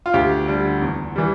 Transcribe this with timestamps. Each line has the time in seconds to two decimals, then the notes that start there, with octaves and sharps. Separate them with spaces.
0.06 F4
0.14 D2 G4
0.48 D3 G3
0.82 E2
1.16 E3 G3